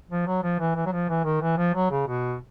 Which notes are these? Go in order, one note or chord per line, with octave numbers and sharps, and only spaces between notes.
F3
F#3
F3
E3
E3
F#3
F3
E3
D#3
E3
F3
F#3
C#3
B2